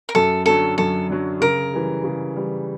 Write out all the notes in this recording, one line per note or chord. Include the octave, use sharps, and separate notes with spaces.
A#4
F#2 A4
D3 F#3 A4
F#2 A4
D3 F#3
C#3 A#4
E3 G3
C#3
E3 G3